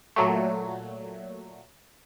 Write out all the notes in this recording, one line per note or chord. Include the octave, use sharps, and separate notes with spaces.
A#2 F#3 A3